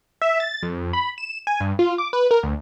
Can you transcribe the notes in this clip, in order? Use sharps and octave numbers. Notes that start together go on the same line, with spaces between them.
E5
A6
F2
B5
E7
G#5
G2
F4
D6
B4
A#4
D2